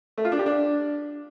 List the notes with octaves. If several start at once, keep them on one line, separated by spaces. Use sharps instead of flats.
A3
F4
D4
G4
D4